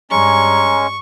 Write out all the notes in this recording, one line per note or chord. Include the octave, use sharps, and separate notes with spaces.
G2 G#3 C#4 A#5 C#6